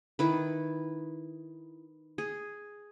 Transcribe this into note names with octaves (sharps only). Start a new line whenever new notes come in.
D#3 E4 B4
G#4